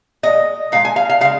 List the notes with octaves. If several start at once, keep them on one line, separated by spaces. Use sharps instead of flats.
A#2 G#3 D#5
A#2 G#3 F5
G#5
F5
F5
C#3 G#3 F5